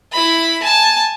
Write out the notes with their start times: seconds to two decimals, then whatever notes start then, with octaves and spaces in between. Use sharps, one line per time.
0.12 E4 B5
0.62 G#5 A5